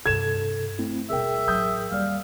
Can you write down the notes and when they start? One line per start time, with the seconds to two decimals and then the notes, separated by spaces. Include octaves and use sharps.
0.06 G2 C3 D4 A4 G#6 E7
0.79 A3 C4 E4
1.10 D#1 B2 G#4 A#4 E5 G5
1.48 A1 F#3 D#6 G6
1.91 D#2 G3 D5 F5